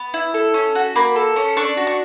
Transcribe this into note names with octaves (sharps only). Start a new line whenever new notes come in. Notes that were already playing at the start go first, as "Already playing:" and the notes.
Already playing: B3
E4
A4
C#4
F#4
A#3 B5
A4
C#4
D4 C#6
F#4
C#6